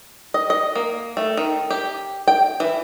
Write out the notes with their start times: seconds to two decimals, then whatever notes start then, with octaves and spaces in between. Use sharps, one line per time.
0.34 D#5
0.50 D#5
0.75 A#3
1.17 A3
1.37 D#3
1.71 G4
2.28 G5
2.60 E3